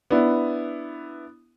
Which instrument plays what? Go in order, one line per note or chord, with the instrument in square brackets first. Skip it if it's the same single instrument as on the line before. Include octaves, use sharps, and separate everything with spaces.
[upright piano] B3 D4 E4